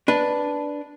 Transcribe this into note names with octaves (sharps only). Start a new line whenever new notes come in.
D4 B4